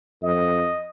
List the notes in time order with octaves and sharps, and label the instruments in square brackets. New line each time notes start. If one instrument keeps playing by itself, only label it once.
[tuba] F2 [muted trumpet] D#5